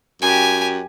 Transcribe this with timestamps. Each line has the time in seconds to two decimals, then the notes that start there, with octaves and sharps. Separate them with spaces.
0.22 F#2 G4 G#5